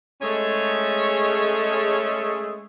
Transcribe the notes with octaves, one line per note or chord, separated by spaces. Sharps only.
G#3 A3 C#4 G#4 A4 C#5